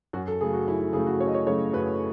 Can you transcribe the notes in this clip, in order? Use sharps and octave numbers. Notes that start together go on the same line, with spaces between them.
F#2 F#4
A4
C#3 F#3 A3 G#4
F#4
F#2 E4
E4
C#3 F#3 A3 G#4
F#4
F#2 C#5
D#5
C#5
C#3 F#3 A3 C#5
F#2 B4